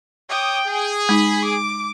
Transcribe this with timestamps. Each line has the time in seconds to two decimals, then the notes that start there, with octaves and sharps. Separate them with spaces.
0.29 C#5 G5 D6 D#6
0.67 G#4
1.09 G#3 D#4 B5
1.45 D6